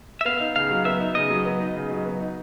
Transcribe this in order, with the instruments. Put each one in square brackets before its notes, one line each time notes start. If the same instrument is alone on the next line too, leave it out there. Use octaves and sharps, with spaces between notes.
[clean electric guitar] E5
[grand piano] B3 [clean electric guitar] F5
[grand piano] D#4
[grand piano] C#3 [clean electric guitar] F5
[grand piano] F#3
[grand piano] B3 [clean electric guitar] E5
[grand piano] D#4
[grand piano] C#3 [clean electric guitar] D#5
[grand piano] F#3
B3
D#4
C#3
F#3
B3
D#4